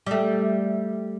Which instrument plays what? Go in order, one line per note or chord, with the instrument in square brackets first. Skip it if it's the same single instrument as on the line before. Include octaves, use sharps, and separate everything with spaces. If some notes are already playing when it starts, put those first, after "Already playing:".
[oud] G3 A3